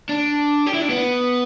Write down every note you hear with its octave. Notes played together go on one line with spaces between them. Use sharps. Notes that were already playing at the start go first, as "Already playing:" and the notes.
D4
G4
E4
D4
B3